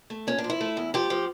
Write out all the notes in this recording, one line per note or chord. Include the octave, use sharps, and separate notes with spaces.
A3
A#2 C#4
D4
F3
E4
A3
E2
F3 G4
F3